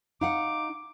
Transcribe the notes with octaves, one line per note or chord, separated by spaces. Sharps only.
D#4 F5 F#5 D6